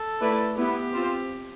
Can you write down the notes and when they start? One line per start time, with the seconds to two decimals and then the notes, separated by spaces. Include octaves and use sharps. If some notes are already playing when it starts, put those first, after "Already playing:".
Already playing: A4
0.21 A3 E4 B4 D5
0.58 B3 E4 G4 B4
0.94 C4 F4 C5